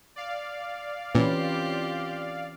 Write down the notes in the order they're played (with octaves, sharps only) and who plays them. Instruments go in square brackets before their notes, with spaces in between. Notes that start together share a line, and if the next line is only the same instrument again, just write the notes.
[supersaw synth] D5 F5
[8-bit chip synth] A#2 [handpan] E3 C#4 B4 [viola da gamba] C4 F4 G4